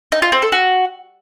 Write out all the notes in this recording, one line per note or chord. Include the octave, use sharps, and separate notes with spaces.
D#4
F4
C4
A4
F#4